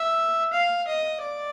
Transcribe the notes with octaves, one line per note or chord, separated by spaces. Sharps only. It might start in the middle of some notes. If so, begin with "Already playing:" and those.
Already playing: E5
F5
D#5
D5